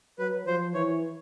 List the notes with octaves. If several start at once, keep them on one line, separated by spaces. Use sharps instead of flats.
F#3 B4
F3 C5
E3 C#5